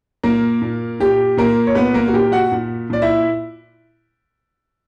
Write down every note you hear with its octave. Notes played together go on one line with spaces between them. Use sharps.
A#2 A#3 A#4
A#2
A#2 G4
A#2 A#3 A#4
C#5
A#2 B3 B4
A#3 A#4
F#4
A#2 G4
F#4 F#5
A#2
A#2 D5
E4 E5